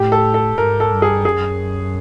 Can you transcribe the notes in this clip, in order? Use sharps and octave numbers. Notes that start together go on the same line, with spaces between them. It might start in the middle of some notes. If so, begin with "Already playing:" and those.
Already playing: A2 G4
A4
A4
G#2 A#4
A4
G2
G#4
F#2 G#4